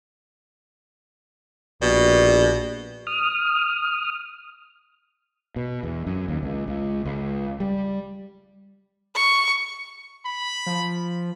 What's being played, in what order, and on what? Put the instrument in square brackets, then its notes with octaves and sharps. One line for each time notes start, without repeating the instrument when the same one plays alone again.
[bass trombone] A#1 [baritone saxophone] B2 [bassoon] G3
[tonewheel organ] D#6 F6
[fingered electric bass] B2
E2
F#2
D#2
C#2
C#2
C#2
G3
[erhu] C#6
[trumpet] B5
[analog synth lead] F3